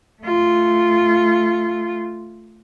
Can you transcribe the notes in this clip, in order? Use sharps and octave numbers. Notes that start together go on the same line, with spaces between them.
A3 F4